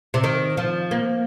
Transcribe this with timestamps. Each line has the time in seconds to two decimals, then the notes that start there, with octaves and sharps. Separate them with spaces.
0.14 C3
0.24 D#3
0.57 F3
0.91 A#3